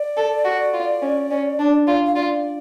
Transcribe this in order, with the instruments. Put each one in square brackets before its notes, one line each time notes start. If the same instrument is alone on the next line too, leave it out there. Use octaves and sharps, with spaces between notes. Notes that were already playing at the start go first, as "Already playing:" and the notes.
Already playing: [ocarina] D5
[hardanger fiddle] A4
F#4
F4
C#4
C#4
D4
F4
[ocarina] F5
[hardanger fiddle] F4 [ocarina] D5